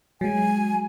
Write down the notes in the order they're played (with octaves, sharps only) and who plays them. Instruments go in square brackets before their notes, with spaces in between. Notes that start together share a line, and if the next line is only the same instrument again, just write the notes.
[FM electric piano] F#3 G#3 [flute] G#5